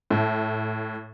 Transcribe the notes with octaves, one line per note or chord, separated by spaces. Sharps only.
A2